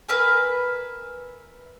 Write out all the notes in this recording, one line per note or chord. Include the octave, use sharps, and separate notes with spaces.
A#4 B4 E5 G#5